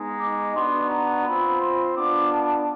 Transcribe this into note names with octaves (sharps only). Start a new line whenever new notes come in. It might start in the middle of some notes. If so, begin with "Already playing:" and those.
Already playing: G#3 B3 D#4
D6
B3 D4 F#4 C6
A#5
C4 F4 B5
C6
B3 D4 F4 D6
A5